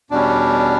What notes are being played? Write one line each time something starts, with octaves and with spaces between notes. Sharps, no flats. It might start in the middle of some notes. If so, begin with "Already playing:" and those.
E2 B2 G3 C#4 D4